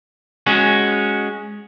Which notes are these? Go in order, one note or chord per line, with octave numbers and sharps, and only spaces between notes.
G#3 C#4 F#4